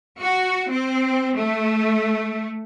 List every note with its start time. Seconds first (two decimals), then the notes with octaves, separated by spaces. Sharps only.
0.20 F#4
0.70 C4
1.36 A3